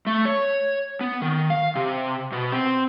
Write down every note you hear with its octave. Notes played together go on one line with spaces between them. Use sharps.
A3
C#5
B3
D#3
F5
C3
B2
C4